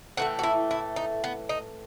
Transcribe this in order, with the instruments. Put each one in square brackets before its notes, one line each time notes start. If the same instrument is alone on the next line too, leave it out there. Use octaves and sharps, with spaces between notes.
[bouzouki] A2 E3 A3 F#4
F#4
E4
E4
D#4
B3
D#4